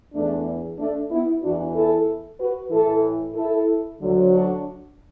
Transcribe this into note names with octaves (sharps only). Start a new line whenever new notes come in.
E2 E3 A3 D4
A3 D4
B3 E4
E2 E3 D4 F#4
E4 A4
F#4 B4
A2 E3 E4 A4
E4 A4
D2 D3 F#3
D4 F#4